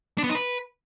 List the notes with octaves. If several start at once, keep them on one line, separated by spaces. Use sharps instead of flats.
D4
B3
D#4
B4